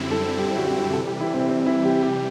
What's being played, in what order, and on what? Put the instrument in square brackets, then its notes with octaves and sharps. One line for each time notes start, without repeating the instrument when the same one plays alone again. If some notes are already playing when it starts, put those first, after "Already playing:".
Already playing: [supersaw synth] F#2 D3 G3 C4 E4
[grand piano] A4
G4
F#4
G4
[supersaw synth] C3 E3 G3 [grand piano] A4
[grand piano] G4
E4
C4
C4
E4
G4
G4